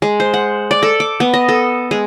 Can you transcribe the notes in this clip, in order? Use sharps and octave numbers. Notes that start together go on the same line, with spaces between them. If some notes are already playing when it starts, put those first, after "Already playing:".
G#3
C5
F#5
D5
A4
D6
B3
D#5
A4
G#3